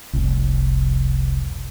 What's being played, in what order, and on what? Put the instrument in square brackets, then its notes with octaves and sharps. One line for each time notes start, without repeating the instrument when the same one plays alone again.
[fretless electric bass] F1 C2